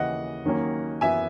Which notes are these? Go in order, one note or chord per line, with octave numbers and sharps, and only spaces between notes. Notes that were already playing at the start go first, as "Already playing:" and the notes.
Already playing: D#2 C#3 E3 D#5 F#5
D#2 D#3 F#3 A#3 C#4
F#2 E3 B3 E5 G#5